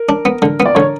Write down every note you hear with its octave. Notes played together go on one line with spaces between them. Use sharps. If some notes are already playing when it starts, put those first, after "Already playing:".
Already playing: A#4
D4
B3
D3
B3
D5
D3 C#5